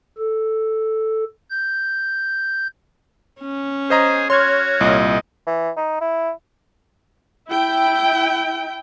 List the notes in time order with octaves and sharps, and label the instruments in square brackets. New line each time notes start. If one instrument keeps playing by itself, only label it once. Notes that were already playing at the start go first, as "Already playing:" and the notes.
[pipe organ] A4
G6
[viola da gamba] C#4
[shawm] G#4 [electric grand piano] C5 D#5 A#5
[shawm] F#4 [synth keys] C#5 F6 G#6 [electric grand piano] C6
[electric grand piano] C2 A#2 [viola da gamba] D#5
[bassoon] E3
D#4
E4
[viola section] E4 G5